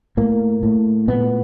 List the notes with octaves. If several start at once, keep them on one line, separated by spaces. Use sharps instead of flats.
A2 A#3
A2
A#2 B3